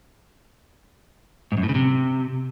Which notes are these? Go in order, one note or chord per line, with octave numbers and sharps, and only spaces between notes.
G#2
F#2
A2
C#3
C3